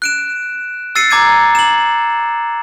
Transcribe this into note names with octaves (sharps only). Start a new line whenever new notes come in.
F#6 D7 E7
E6 A6 C7 C#7 D#7
A#5 D6 G#6 D#7
E7 F#7